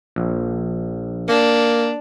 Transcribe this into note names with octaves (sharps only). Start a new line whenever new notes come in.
A#1
A#3 D4